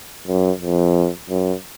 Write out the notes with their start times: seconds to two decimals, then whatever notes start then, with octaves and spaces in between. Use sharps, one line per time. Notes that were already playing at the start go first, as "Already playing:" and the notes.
0.27 F#2
0.61 F2
1.30 F#2